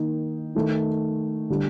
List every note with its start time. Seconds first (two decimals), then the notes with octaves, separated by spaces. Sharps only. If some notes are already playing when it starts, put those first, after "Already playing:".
Already playing: D#3 A#3 D#4
0.55 D#3 A3 D#4
1.50 D3 G3